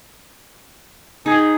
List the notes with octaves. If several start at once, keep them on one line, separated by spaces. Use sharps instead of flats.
D#4 G#4